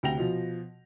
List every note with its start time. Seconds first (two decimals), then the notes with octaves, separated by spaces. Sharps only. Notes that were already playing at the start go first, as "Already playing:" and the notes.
0.03 D2 C3 G5 A#6 F7
0.18 B2 F3